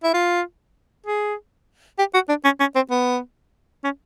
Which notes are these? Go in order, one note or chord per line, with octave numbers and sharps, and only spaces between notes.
E4
F4
G#4
G4
F#4
D4
C#4
C#4
C4
B3
C#4